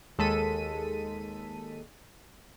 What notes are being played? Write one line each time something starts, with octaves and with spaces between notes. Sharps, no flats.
D#2 G#3 A4 B6 D#7